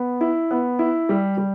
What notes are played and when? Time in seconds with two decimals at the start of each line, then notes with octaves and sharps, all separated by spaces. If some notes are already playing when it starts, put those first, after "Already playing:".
Already playing: B3
0.21 E4
0.51 B3
0.79 E4
1.09 G3
1.38 G3